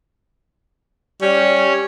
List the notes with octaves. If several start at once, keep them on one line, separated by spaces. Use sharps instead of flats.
G3 C#4 C#5